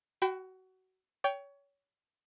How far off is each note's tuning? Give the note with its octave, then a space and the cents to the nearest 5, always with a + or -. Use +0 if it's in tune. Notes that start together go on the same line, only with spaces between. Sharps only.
F#4 +20 G5 -20 B5 +35
C#5 +25 G5 +0